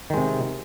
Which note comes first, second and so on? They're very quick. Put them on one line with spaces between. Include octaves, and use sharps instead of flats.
D#3 G#3 C3